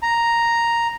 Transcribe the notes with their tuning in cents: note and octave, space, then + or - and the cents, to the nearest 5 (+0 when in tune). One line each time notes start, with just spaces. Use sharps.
A#5 +0